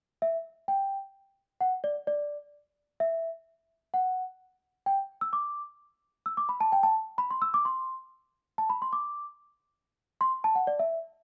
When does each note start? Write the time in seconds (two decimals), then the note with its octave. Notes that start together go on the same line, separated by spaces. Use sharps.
0.22 E5
0.68 G5
1.61 F#5
1.84 D5
2.07 D5
3.00 E5
3.94 F#5
4.86 G5
5.21 E6
5.33 D6
6.26 E6
6.37 D6
6.49 B5
6.61 A5
6.72 G5
6.83 A5
7.18 B5
7.31 C6
7.42 E6
7.54 D6
7.65 C6
8.58 A5
8.70 B5
8.82 C6
8.93 D6
10.21 C6
10.44 A5
10.55 F#5
10.67 D5
10.79 E5